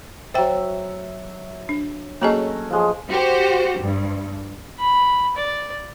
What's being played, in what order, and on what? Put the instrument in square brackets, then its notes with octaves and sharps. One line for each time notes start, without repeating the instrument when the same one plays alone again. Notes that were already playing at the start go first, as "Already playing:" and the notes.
[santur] F#3 E5 [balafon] C5 G5
[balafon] D4
[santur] F#3 A3 C#4 [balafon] A#3 G#4 D#5
[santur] F3 G#3 G#4
[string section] F#4 G4 C5
G2
[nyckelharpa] B5
D5